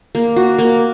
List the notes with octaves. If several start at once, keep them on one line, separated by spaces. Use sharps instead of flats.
A#3
F#4
A#3